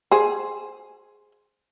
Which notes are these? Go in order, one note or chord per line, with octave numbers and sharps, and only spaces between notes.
G#4 C5